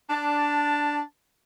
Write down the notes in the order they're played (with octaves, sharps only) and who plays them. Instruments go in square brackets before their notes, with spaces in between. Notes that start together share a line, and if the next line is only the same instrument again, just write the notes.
[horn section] D4 A5